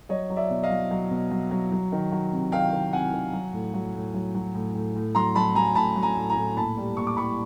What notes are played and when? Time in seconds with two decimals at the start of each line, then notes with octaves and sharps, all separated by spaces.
0.09 F#3 C#5 D#5
0.30 F#3
0.36 D5 E5
0.50 B2
0.63 D#5 F5
0.70 F#3
0.91 F#3
1.11 B2
1.31 F#3
1.51 F#3
1.72 F#3
1.92 D#3
2.12 F#3
2.32 C3
2.52 D#3 F5 G5
2.72 D#3
2.93 C3 F#5 G#5
3.13 D#3
3.33 F#3
3.53 A2
3.74 F#3
3.94 A2
4.14 F#3
4.35 F#3
4.55 A2
4.75 A2
4.95 A2
5.15 F#3 A#5 C6
5.36 F#3 A5 B5
5.55 F#3 G#5 A#5
5.75 A2 A5 B5
5.96 F#3
6.02 G#5 A#5
6.16 A2
6.30 G#5 A#5
6.36 A2
6.57 A#2 A5 B5
6.77 G3
6.97 A#2 C#6
7.07 D6
7.17 G3 B5 C#6